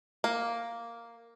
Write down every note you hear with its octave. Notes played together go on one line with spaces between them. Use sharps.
A#3